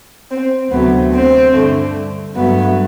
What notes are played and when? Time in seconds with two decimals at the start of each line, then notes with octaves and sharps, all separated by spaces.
0.29 C4
0.70 D2 C3 F#3 A3 B3
1.12 C4
1.53 G2 D3 A3
2.35 G2 F#3 A3 B3